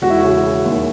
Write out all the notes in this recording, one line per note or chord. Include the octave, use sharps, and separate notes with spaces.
E1 F#4
E4
C#3 F#4
C#3
D#2